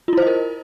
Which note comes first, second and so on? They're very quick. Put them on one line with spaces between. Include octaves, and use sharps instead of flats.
F4 E4 C5 D#5 A#4